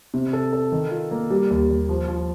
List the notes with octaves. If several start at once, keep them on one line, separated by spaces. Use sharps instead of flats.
C3
A4
A4
D#3
F4
A#3
G3
D#2
D#2
F3
F3